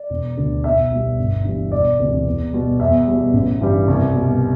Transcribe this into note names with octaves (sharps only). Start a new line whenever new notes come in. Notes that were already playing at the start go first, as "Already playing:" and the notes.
Already playing: D5
E1
D2 D3
B1 E5
B2 G3
G1
G2 E3 G3
E1 D5
D2 C3 E3
E2
B2 G3
E2 E5
B2 G3
A1
G2 E3 G3
C2
B2 G3